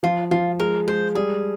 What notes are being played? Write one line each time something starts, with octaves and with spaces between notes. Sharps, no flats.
F3 F4
F3 F4
G#3 A#4
G#3 C5
G3 G#4